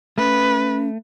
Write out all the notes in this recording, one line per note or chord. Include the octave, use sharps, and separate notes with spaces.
A3 C#4 B4